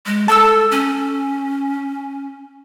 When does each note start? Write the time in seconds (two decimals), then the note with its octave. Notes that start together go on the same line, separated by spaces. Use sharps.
0.06 G#3
0.28 A4 A5 E6
0.71 C#4